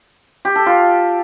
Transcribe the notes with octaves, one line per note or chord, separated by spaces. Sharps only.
G4
A4
F4